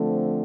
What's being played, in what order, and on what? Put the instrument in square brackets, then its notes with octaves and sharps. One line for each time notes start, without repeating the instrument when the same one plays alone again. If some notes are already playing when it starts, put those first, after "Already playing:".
Already playing: [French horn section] D3 F3 A3 C4